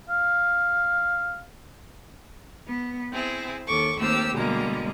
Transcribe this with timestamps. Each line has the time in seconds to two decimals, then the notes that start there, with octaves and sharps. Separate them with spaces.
0.10 F5
2.66 B3
3.12 C4 E4 G#4
3.66 D#2 A4 C#6 D6
3.97 D#2 A3 A#3 C4 G4 E6
4.33 B2 D3 G3 G#3 A#3 A#5